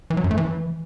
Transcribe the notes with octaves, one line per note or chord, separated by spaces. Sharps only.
E3
F#3
F#2
A3
E3